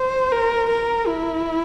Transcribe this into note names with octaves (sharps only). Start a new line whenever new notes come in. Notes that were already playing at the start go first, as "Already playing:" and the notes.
Already playing: C5
A#4
A#4
E4